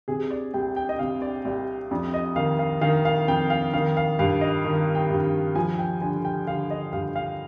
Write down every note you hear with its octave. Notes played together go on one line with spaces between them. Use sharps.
C3 G#4
D5
C2 G5
G5
D#5
C3 F5
D5
C2 D5
F2 D5
D#5
D#3 F5
F5
D#3 F5
F5
F2 G5
F5
D#3 F5
F5
G2 F5
D#5
D#3
G5
G2
F3 G#5
G5
D3 G#5
G5
D3 F5
D#5
G2 F5
F5